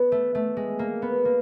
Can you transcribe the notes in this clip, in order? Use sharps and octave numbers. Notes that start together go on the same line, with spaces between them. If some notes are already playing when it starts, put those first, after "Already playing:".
Already playing: B3
A3
A3
G#3
A#3
B3
A#3